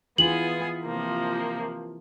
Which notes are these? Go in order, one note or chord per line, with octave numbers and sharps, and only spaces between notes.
E3 B3 F4 G#4 F#7
C3 F3 A#3